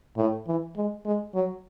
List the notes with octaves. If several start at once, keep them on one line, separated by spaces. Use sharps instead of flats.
A2
E3
G#3
G#3
F#3